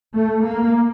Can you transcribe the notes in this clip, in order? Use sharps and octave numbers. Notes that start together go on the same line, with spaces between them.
A3
A#3